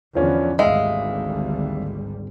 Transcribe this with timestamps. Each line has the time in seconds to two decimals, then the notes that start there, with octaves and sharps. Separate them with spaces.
0.15 E2 D3 F3 C#4 D4
0.59 G#1 D2 G3 G#3 E5 F5